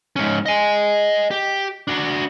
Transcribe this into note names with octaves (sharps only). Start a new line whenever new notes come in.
G#2 C#4
D#5 G#5
G4
D4 F#4